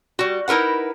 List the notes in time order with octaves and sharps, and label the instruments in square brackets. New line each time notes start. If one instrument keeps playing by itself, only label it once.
[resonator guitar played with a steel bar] G3 F#4
D#4 E4 A#4 B4 F#5